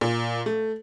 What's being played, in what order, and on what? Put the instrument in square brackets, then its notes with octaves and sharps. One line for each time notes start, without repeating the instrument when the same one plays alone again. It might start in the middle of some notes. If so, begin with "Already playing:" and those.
[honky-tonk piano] A#2
A3